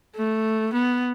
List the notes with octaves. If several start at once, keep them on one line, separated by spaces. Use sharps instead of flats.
A3
B3